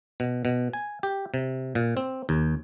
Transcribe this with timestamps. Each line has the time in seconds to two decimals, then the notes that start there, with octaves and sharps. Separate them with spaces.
0.20 B2
0.45 B2
0.73 G#5
1.03 G4
1.34 C3
1.75 A#2
1.97 C4
2.29 D#2